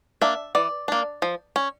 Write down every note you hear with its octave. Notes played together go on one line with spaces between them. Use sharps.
A#3 D4 E5
E3 D5
A#3 D4
F3
C#4